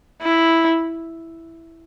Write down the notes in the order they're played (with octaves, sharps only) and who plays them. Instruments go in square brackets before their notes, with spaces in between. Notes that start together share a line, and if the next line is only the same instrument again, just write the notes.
[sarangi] E4